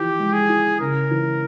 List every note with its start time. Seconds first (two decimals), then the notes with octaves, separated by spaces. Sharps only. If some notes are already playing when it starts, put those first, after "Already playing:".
Already playing: E3 F3 G4
0.18 G#3
0.33 G#4
0.49 E4
0.80 C#3 A#4
1.11 E3